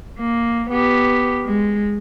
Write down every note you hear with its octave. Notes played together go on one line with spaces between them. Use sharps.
A#3
B3 G4
G#3